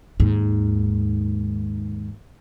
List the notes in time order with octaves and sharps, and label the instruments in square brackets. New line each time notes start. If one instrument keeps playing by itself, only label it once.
[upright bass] D#2 G#2